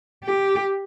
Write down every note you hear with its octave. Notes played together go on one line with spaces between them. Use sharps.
G4